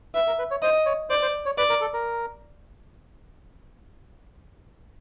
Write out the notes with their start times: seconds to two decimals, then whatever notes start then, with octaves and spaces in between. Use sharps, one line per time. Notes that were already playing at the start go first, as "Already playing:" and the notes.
0.15 B4 E5
0.27 A#4
0.38 B4
0.51 C#5
0.62 C5 D#5
0.86 C#5
1.10 C5 D5
1.22 C5
1.46 C#5
1.58 B4 D5
1.70 A#4
1.81 A4
1.94 A#4